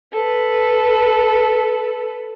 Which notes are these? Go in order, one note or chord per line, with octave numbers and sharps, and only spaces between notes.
A4 B4